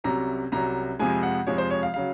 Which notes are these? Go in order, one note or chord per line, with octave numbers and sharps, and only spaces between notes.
C2 C3 F#3 C#4 A#5
C2 C3 F#3 C#4 A#5
F2 C3 F3 G#3 G#5
F#5
F2 C3 F3 G#3 C#5
C5
C#5
F5
C#3 F#3 F5